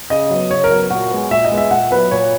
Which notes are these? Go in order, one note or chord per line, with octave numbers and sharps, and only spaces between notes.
C#3 D#5
F#3 B3
C#3 C#5
A#4
F#3 B3
A#2 F#4
G#3 B3
A#2 E5
D#5
G#3 B3
E5
A#2 F#5
F#3 B3 B4
A#2 C#5